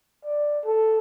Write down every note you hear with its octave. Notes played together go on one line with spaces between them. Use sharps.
D5
A4